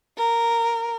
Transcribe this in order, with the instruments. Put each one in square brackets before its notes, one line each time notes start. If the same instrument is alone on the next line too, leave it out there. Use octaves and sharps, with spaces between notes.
[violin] A#4